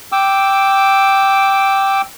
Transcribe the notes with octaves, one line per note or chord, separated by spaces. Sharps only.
G5 D6 E6